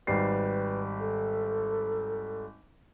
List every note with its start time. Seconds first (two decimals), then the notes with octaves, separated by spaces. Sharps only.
0.07 G#1 G3 B4 C7
1.00 A4